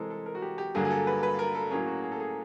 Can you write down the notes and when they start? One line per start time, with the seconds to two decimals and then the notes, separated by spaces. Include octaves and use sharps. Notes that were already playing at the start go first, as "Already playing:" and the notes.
Already playing: C3 E3 G#3 C4 A4 A#4
0.10 A4
0.26 A#4
0.35 F#4
0.42 G4
0.58 G4
0.75 G2 D3 F#3 A#3 G#4
0.85 G#4
0.90 A4
1.07 B4
1.23 B4
1.39 A#4
1.55 A4
1.71 A2 F#3 A#3 C#4 G#4
1.87 F#4
2.03 G#4
2.12 A4
2.20 G#4